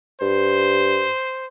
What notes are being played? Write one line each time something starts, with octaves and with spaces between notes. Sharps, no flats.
G2 C5